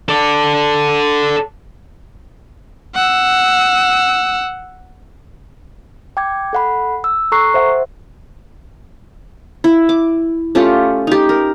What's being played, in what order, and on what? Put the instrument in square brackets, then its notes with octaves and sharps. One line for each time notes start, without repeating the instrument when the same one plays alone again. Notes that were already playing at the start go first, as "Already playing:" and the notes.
[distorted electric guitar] A4 D5
[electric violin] F#5 E6
[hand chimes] G5 D6 G#6
A4 F#5 B5
E6
A4 A#5 C#6 F#6 C7
C5 E5 F#5
[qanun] E4
D6
A3 C#4 F4 G4
D#4 G4
A#4